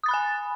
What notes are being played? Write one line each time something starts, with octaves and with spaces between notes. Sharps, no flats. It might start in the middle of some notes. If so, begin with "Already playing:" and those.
G#5 B5 D#6 F#6 A6